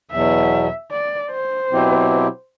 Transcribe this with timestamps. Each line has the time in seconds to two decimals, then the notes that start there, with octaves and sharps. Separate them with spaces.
0.11 E2 B2 F#3 E5
0.91 D5
1.31 C5
1.71 B2 F#3 C4 E4 G4